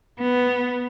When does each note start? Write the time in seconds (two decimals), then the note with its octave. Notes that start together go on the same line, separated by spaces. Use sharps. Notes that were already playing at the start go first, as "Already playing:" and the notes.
0.19 B3